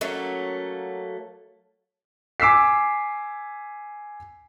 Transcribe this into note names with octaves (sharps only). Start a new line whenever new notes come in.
F#3 A3 A#3 C#4
G#5 D6 E6 B6 C7